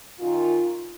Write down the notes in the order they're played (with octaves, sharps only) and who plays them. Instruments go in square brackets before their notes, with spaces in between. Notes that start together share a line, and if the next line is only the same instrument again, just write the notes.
[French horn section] F#2 D#3 F4